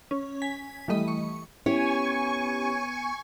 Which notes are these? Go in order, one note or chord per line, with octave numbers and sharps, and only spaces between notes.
C#4
G#5 B6
E3 G3 A3 D#5 B5
C#6
B3 C#4 E4 G4 C#5 G#5 C#6